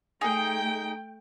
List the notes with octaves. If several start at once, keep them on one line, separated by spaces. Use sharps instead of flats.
A3 D#4 G#4 G5